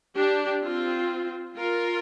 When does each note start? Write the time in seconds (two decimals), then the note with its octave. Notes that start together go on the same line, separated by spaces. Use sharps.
0.15 D4 G4
0.62 C4 F4
1.56 F4 A#4